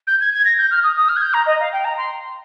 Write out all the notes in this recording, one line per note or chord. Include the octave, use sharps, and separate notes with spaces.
G6
G#6
G#6
A#6
G6
F6
D#6
D#6
F6
G#6
G6
A#5
D#5
F5
G5
A#5
C6